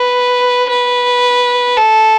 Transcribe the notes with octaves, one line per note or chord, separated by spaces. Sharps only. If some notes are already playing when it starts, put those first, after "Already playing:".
Already playing: B4
B4
A4